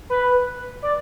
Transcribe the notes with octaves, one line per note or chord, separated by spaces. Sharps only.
B4
D5